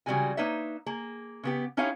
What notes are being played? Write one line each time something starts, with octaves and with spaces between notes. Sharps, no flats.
C#3 E3 G3 G#3 F#4 G#5
A#3 D#4 B4 C#5 E5
A#3 G#4
C#3 B3 G4
C#4 D#4 E4 G4 C#5 F5